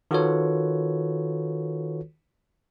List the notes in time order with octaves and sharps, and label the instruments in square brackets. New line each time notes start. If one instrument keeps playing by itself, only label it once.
[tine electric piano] D#3 F4 F#4 A4 B4 C#5